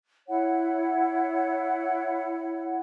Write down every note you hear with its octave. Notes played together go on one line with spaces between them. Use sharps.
E4 C#5 F#5